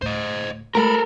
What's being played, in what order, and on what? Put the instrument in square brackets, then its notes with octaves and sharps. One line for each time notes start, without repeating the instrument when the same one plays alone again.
[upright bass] D2 A2 [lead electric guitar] C5 D#5
[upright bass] G#3 A3 [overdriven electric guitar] A4 A#4 [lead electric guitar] A#5 B5